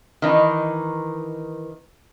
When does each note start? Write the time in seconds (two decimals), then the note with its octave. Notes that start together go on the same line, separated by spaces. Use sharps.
0.22 D#3 E3 D#4